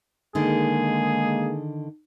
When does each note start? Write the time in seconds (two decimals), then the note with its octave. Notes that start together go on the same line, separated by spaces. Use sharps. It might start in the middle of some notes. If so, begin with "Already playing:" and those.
0.35 D3 D#3 G#3 A#3 D#4 G#4